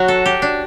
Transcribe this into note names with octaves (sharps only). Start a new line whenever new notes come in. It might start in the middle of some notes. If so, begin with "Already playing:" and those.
Already playing: F#3 F#4
A4
G4
D4